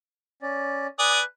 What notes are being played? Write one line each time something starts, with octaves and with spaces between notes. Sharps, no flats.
C#4 D5
B4 D5 G#5 D#6